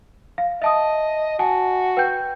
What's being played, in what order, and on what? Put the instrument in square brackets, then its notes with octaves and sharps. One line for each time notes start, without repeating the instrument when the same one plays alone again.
[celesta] F5
[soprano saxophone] D#5 [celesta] E5 A5 D#6
[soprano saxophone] F#4 [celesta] G#5 A5
[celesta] B4 G5 G6